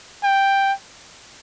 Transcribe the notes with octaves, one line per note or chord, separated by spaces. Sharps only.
G5